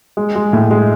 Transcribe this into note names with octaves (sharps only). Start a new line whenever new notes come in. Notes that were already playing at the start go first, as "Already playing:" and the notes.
G#3
G#3
A2
G#3